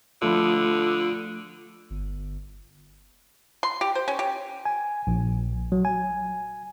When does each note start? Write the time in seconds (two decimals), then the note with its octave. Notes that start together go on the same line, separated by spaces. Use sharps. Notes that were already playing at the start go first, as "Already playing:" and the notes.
0.22 D3 F3 A3 F4 A4 B5
1.90 G1
3.63 C6
3.81 G4
3.95 C5
4.08 C#4
4.19 G4
4.66 G#5
5.07 A#1
5.72 F#3
5.85 G#5